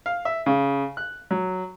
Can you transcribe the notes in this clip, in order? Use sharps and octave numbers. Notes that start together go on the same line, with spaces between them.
F5
E5
C#3
F#6
F#3